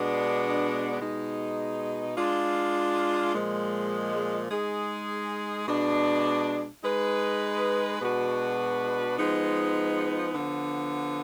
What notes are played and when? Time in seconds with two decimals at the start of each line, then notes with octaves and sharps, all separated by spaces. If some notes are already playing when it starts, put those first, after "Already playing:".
Already playing: B2 G#3 B3 D4
1.01 B2 G#3 D#4
2.17 G#3 D4 F4
3.34 A#2 F3 G#3
4.51 G#3 D#4 G#4
5.68 B2 G#3 D4
6.84 G#3 D#4 G#4 B4
8.01 B2 G#3 D4 F#4 B4
9.18 F3 G#3 B3 D#4
10.34 D3 F3 B3